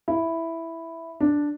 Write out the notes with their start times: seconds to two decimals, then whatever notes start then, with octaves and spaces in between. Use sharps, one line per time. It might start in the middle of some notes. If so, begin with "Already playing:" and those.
0.08 E4
1.20 D4